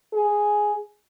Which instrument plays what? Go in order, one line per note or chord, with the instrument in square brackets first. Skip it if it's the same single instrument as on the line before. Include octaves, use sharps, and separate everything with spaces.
[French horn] G#4